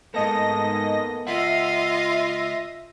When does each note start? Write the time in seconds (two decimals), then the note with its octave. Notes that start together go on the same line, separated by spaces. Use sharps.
0.14 G#2 A#3 B3 A4 D#5 A#6
1.27 C#2 F4 D#5 E5 F#5 A#6